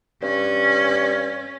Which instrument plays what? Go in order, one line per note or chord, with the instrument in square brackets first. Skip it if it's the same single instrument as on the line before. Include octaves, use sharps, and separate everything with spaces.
[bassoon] G2 [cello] C#4